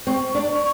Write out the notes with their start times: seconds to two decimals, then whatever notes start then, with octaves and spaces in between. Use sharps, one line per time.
0.07 C4 C#6
0.35 D4